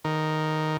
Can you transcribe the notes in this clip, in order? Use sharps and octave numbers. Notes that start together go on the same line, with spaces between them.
D#3